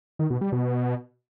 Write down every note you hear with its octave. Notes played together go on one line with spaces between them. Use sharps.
D#3
B2
G3
B2